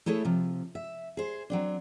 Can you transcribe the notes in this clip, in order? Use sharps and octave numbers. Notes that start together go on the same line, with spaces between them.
A3 E4 G#4 A4 C#5
C3 F3
E5
G#4 C5
F#3 C4 D4